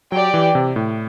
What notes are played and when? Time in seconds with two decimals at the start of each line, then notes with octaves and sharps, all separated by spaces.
0.12 F#3 G4 D5 G5
0.34 E3
0.55 C3
0.76 A2